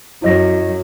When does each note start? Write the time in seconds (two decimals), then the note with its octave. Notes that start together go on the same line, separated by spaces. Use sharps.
0.22 F#2 F#3 E4 D#5 A#6